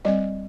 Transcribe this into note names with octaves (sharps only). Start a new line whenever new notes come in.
G3 C4 D#5